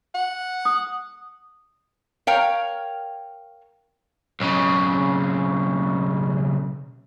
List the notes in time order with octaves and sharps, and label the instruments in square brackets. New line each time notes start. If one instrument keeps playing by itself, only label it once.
[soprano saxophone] F#5
[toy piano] D#6
[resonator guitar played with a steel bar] A#4 C#5 F5 G5 A#5
[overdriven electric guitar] B1 C#3